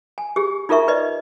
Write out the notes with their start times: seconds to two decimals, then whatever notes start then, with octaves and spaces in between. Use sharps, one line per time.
0.18 G#5
0.36 G4 G#4
0.69 D#4 F4 A4 A#4 E5 C#6
0.88 B4 D5 D#5